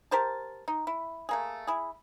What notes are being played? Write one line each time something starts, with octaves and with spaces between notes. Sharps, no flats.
G4 A#4 C5 A5
D#4
E4
A3 A#3 G#4
E4 G#4